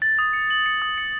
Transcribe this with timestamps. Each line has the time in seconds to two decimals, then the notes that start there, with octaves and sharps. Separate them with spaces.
0.02 A6
0.19 D#6
0.33 C#7
0.50 F#7
0.66 C#7
0.82 D#6
0.98 C#7